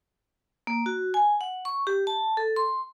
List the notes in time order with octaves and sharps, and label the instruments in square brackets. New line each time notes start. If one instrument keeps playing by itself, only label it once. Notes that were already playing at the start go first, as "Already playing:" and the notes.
[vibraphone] A#3
F#4
G#5
F#5
C#6
G4
A5
A4
C6